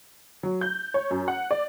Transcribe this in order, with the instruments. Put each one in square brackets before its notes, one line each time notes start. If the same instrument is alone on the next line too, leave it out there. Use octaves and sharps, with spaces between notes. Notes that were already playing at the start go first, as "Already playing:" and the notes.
[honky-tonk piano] F#3
G6
C#5
F#2
F#5
D5